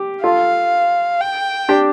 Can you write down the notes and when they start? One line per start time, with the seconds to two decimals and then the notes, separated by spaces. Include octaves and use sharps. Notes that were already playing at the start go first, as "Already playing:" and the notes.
Already playing: G4
0.24 F4 A4 F5
1.21 G5
1.69 D4 G4